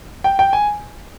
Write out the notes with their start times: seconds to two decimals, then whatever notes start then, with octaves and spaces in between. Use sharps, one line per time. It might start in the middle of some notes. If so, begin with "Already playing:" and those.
0.24 G5
0.39 G5
0.53 G#5